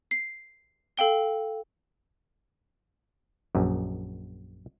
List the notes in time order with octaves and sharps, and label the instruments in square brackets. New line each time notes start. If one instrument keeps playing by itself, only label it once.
[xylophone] C7
A4 F5 G5 G7
[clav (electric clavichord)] A#1 F#2